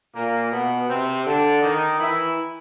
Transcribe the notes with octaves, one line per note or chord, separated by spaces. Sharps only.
A#2 A#3
B2 B3
C3 C4
D3 D4
D#3 D#4
E3 E4